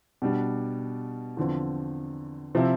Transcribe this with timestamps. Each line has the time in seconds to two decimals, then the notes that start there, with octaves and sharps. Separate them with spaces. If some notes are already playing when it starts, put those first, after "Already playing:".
0.22 B2 G3 D4
1.37 E2 D3 F3 C4
2.55 C3 F3 C4 E4